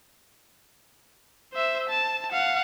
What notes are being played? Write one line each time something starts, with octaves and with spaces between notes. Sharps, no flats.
C5 E5
A5
F5 F#5